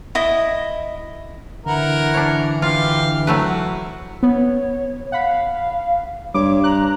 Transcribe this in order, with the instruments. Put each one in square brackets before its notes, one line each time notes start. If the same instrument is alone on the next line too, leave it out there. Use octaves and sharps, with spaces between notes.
[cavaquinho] E4 D#5 D#6
[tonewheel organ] D3 [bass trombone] E3 [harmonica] E4 A#4 F#5
[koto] D4 C#5
[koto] F4 [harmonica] G4 F5
[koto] F#3 A3 B4 [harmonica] F#4
[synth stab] B3 [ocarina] C#5
[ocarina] F5 [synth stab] F#5 B5
[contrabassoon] G2 [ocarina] C#5 [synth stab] D6
[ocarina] A#5 [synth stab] F#6